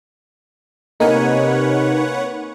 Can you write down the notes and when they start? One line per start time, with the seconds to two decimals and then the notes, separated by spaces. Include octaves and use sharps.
1.00 C3 A#3 D#4 B4 C#5 F#5 G#5